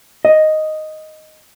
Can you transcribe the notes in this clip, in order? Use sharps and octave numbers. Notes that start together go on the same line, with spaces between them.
D#5